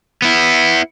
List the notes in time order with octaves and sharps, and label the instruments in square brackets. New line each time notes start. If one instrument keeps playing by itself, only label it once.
[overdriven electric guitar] B3 E4